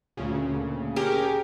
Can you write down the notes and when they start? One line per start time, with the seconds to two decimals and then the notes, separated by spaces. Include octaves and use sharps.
0.17 D2 A#2 C#3
0.96 C#4 G4 G#4 A#4